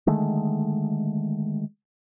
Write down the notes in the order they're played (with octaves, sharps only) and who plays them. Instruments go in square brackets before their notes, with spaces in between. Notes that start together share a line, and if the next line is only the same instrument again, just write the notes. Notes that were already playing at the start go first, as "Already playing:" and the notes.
[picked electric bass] D3 D#3 G#3 A3